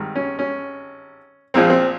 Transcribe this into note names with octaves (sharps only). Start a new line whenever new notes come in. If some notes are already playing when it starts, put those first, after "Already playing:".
Already playing: G#1 G2 D#3
C#4
C#4
A#1 A#2 F3 C4
C4